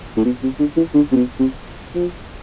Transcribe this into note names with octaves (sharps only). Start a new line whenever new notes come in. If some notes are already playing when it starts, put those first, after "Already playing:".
A2
B2
C3
D3
E3
D3
C3
B2
C3
F3